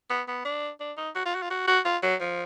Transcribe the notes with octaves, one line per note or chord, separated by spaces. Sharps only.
B3
B3
D4
D4
D#4
F#4
F4
F#4
F4
F#4
F#4
F4
F#3
F3